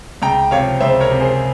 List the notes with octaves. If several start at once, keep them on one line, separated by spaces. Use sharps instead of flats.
C#2 G5 A#5
C3 F3 C#5 F5
C#2 C5 E5
A#4 C#5
C3 F3
G#4 C5